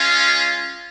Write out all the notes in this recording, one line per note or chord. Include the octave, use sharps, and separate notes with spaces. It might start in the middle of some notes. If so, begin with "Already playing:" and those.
Already playing: G#3 C#4 F4 F5